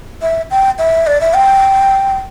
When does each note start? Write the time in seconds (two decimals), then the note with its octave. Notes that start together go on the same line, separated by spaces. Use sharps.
0.22 E5
0.51 G5
0.78 E5
1.07 D5
1.21 E5
1.35 G5